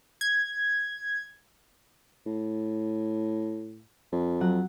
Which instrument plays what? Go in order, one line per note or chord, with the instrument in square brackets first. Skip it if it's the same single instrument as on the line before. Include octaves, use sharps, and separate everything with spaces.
[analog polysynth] G#6
[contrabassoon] A2
F2
[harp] F#3 F#5